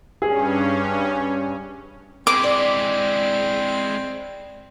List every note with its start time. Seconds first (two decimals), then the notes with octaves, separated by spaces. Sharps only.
0.22 G2 C#4 G#4
2.27 G#3 C4 E4 D6
2.44 D5